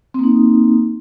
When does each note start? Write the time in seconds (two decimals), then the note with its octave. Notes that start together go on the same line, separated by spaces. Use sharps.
0.14 C4
0.19 A#3
0.24 D#4